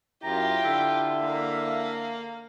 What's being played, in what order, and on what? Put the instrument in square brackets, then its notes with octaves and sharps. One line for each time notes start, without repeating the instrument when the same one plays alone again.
[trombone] F#2 [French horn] E4 [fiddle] F4 G4 [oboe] A#5
[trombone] D3 [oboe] E5
[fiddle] A#3 F5